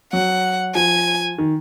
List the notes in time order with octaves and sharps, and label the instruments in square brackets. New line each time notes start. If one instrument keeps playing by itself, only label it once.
[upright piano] F#3 [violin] F#5
[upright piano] F3 [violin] G#5
[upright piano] D#3